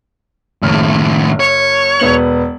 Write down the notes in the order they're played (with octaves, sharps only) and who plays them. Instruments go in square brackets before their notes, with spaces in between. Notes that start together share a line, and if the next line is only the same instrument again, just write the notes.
[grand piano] F#1 F6 [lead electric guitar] A2 D#3
[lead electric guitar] C#5
[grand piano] E1 B3 F#7